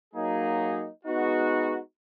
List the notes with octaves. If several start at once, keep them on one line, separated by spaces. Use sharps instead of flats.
F#3 A#3 D#4 G#4
G#3 B3 D#4 F#4